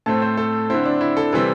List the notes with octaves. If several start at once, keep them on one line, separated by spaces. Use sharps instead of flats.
A2 A3 C4 A5
C5
A4
D3 C4 E4
D4
E4
A4
C3 E3 G3 C4 A4